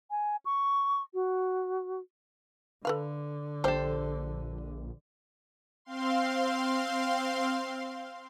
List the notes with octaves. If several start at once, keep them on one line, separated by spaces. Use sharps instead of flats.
G#5
C#6
F#4
D3 A4 B4 F5
A#1 G3 D4 G4 A4 C5
C4 F5 C6